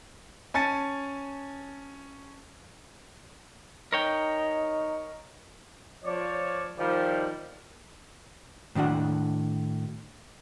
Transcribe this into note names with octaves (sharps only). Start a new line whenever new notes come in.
C#4 G#5 A5 A6 C#7
D#4 A#4 C#5 G5
F3 C#5 D5
D#3 F3 G3
A2 D#3 D4 F#4 F#5